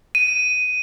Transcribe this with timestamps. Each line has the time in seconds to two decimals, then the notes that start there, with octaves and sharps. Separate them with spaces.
0.15 D#7